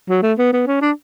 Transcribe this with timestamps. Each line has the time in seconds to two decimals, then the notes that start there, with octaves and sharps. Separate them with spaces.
0.09 F#3
0.23 A3
0.38 B3
0.53 B3
0.67 C#4
0.81 D4